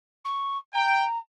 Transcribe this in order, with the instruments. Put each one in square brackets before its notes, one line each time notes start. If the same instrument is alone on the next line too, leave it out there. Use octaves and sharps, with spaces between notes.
[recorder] C#6
[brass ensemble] G5 [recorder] A#5